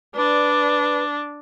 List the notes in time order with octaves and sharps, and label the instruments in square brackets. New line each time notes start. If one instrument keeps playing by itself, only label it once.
[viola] D4 [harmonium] B4 D5